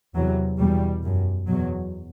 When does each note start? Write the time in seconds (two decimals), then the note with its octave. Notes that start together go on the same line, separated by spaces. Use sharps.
0.15 E2 C3 F#3
0.59 E2 B2 G3
1.02 F#2
1.47 E2 B2 F#3